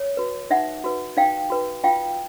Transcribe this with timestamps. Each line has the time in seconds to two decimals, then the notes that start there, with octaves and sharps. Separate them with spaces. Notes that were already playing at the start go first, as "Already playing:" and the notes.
Already playing: C#5
0.17 F#4 B4
0.50 D#4 E5 F#5
0.84 F#4 B4
1.17 D#4 F5 G5
1.50 F#4 B4
1.84 F4 F5 G5